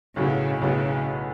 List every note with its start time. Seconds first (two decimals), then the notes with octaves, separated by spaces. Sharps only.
0.16 B1 A2 C#3 F#3 B3
0.61 B1 A2 C#3 F#3 B3